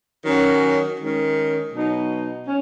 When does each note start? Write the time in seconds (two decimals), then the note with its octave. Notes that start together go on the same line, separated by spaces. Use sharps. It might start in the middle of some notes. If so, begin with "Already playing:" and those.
0.24 D#3 F#3 C#4 F#4
0.98 D#3 G#3 C#4
1.71 B2 F#3 D#4
2.46 C#4